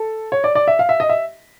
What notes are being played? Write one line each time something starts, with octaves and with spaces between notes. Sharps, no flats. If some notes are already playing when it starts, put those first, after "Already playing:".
Already playing: A4
C#5
D5
D5
E5
F5
E5
D#5
E5